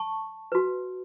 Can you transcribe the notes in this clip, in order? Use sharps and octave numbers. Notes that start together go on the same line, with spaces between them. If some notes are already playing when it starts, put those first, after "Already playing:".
Already playing: A5 C#6
F#4 B4